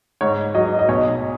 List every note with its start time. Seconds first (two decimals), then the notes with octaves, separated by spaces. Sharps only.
0.21 G#2 C#5
0.55 F#3 D#5
0.79 D#5
0.88 B1 C#5